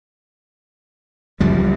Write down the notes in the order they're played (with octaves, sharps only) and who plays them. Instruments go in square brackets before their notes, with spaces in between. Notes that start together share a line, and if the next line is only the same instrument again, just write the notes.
[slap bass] C#2 F3 G3 [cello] F#2